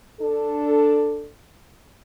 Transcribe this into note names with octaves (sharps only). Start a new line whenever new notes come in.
D4 A4